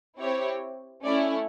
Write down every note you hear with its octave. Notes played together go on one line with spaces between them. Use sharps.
C4 E4 G4 C#5
A3 C#4 E4 D5